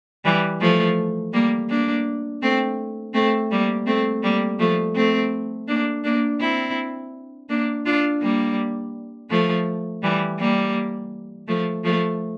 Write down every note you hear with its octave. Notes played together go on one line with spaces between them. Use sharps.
E3 G3
F3 A3
G3 A#3
A#3 D4
A3 C4
A3 C4
G3 A#3
A3 C4
G3 A#3
F3 A3
A3 C4
A#3 D4
A#3 D4
C4 E4
A#3 D4
D4 F4
G3 A#3
F3 A3
E3 G3
G3 A#3
F3 A3
F3 A3